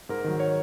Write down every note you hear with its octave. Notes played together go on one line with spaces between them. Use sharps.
G#2 A#4
D#3 F#3
C#5